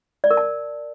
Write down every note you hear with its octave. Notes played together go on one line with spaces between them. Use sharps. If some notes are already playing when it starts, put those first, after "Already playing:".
D5
A#4
A5